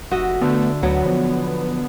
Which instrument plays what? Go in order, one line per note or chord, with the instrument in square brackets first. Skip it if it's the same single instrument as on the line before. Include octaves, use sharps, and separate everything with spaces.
[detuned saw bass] F1 [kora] F#4 D#5 [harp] E5
[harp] D3 [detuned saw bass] A3 [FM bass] B3
[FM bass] D2 [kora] F#3 [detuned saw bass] B3
[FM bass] F3